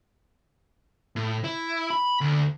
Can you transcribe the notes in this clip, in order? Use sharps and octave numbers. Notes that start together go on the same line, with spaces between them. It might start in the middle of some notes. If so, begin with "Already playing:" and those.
A2
E4
B5
D2